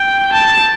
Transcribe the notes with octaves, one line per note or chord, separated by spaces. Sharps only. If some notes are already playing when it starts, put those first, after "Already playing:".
Already playing: G5
A5